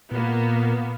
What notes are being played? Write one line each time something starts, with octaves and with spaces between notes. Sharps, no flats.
A#2 A#3 B3